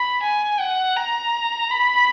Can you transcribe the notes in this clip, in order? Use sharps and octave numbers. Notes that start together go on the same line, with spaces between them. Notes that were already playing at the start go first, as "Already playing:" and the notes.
Already playing: B5
G#5
F#5
A#5
B5